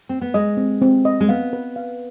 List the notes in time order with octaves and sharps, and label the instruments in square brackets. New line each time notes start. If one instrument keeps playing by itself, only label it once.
[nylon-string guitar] C4
B3
[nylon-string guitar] G#3 [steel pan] D#5
[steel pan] C4
C4
D#5
[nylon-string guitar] G#3
[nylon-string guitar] B3 [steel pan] F5
[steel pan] B4
F5